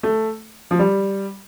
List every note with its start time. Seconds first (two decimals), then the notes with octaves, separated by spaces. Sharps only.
0.03 A3
0.71 F3
0.79 G3